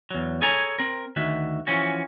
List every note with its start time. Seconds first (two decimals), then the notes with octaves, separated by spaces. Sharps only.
0.11 E2 F#3
0.42 G#4 A4 C#5 G#5 A#5
0.79 C4 A#4
1.16 D2 D#3 F#4 E5
1.67 E3 F3 C#4 F#4